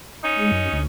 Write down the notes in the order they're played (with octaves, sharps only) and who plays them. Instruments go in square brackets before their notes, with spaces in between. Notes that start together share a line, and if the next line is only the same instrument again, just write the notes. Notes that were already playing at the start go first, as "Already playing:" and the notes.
[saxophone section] C#4 D#4
[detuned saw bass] G#3
F#2
D2